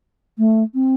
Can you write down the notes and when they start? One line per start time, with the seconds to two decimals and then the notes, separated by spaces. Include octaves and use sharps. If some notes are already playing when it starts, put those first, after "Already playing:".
0.38 A3
0.74 C4